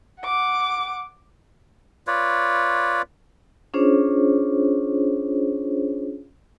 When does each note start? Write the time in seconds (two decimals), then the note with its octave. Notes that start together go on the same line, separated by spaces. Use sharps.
0.21 F#5 D6
2.07 F4 B4 C#5 D5
3.74 C#4 D4 F4 G#4 C5 C#5